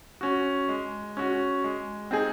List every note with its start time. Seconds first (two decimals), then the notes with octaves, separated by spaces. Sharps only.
0.21 C#4 F#4
0.69 G#3
1.17 C#4 F#4
1.64 G#3
2.11 C4 D#4 G#4